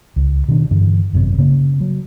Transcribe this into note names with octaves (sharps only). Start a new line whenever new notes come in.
C#2
B2 D#3 D4
G2 D3 E3
G#1 F#2 A2 C3
C#3 A#3
F#3